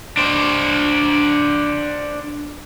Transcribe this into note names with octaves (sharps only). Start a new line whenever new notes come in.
D4 C5